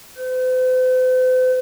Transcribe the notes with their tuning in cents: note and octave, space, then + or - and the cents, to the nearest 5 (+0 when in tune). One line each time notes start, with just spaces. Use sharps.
C5 -45